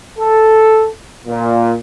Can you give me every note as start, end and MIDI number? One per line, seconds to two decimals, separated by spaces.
0.19 0.87 69
1.27 1.74 46